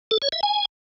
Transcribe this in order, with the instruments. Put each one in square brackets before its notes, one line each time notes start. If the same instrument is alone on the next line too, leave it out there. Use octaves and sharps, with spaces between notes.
[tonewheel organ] A4
C#5
E5
G#5